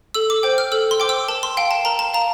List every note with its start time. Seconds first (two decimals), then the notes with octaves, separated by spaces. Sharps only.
0.15 A4 E6
0.30 D6
0.43 C5 G5
0.58 F6
0.72 A4 E6
0.91 C6
1.00 C5 G5 D6
1.09 E6
1.28 A#4 A5
1.43 C6
1.57 F5 G5
1.71 A5
1.85 A#4 A#5
1.99 A5
2.14 F5 A#5